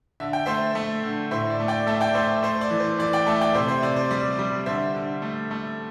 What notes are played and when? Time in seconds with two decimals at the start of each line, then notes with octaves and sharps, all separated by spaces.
0.20 D3 E5
0.33 G5
0.46 A3 C5 E5
0.75 A3
1.03 D3
1.31 A2 C5 E5
1.50 D5
1.60 A3
1.68 D5 G5
1.87 A3 E5 A5
2.01 D5 G5
2.15 A3 C5 E5
2.43 A3 C5
2.61 D5
2.71 E3
2.80 C5
2.99 E3 D5
3.13 D5 G5
3.26 A3 E5 A5
3.41 D5 G5
3.55 C3 C5 E5
3.68 C5 E5
3.82 C3 D5
3.96 C5
4.11 G3 D5
4.39 G3
4.66 D3 C5 E5
4.95 D3
5.22 A3
5.51 A3